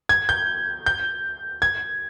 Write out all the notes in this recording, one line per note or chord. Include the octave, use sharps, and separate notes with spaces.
G#6
G6
G6
G#6